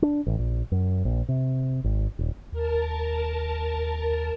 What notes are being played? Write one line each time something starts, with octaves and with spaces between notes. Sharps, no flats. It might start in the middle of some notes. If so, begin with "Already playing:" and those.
D4
A1
A#1
F#2
A#1
C3
G#1
D#1
D#2 A#4 A5